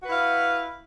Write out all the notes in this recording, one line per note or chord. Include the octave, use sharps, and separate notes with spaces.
E4 F#4 B4 F5